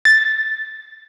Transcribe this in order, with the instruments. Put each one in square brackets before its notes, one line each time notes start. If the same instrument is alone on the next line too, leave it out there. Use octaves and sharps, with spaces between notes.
[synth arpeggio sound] A6